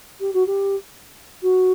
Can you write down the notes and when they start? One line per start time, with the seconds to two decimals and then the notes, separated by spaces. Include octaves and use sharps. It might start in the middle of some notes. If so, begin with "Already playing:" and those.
0.20 G4
0.33 F#4
0.46 G4
1.42 F#4